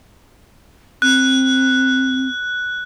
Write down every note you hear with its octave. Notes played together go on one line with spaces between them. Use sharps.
C4 F#6